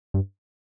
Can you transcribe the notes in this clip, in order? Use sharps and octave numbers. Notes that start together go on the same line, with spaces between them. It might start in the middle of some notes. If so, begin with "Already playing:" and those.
G2